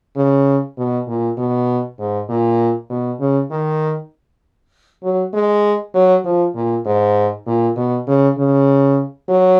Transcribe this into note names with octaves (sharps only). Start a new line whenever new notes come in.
C#3
B2
A#2
B2
G#2
A#2
B2
C#3
D#3
F#3
G#3
F#3
F3
A#2
G#2
A#2
B2
C#3
C#3
F#3